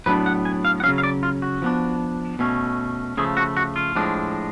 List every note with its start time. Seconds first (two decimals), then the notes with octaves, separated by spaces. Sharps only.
0.06 A2 F#3 B3 D4 B4
0.26 F#5
0.45 G#5
0.65 F5
0.80 F#5
0.83 C#3 F#3 C#4 F5
0.98 F5
1.04 D5
1.23 F4
1.42 F#4
1.62 F3 B3 D4
2.39 B2 A3 C#4
3.17 C#3 F3 A3 G#4
3.37 F#4
3.57 F#4
3.76 F4
3.96 A2 F3 G#3 D4